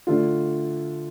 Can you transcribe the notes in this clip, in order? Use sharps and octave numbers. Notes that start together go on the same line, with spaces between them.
D3 A3 D4 F4